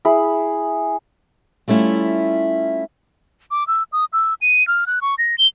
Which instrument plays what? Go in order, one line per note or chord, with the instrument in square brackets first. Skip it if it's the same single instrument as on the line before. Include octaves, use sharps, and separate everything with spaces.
[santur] E4 G#4 B5
[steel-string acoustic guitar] G3 A3 C#4 E4 F4
[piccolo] D6
E6
D#6
E6
D#7
F6
F#6
C#6
A#6
G7